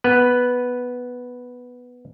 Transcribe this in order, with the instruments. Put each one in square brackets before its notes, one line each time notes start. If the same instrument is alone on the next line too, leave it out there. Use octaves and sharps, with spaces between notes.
[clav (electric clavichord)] B3 B4